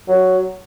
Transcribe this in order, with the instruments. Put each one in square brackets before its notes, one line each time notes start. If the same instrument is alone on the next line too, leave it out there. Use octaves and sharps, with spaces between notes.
[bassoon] F#3